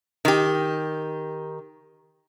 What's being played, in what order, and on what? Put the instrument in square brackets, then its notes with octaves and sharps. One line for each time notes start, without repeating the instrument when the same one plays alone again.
[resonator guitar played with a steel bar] D#3 G4